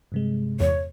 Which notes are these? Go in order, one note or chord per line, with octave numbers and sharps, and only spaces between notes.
G2 C3 G#3
E2 C#5